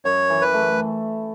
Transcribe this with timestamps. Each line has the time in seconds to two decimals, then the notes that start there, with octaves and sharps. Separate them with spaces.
0.05 F#2 C#5
0.30 E3
0.42 B4
0.54 A3